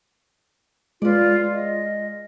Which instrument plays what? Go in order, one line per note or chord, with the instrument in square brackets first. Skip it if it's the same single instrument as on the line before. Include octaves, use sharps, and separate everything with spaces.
[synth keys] G#3 [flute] F4 [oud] B4 D5
[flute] D#5